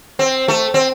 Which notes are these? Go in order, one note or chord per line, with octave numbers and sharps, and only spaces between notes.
C4
A3
C4